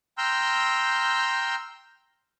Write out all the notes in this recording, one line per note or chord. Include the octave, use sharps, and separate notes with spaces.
G5 A#5 C6 E6 F6 G6